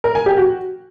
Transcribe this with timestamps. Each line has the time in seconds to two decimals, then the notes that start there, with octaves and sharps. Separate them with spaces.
0.04 A#4
0.15 G#5
0.26 G4
0.37 F#4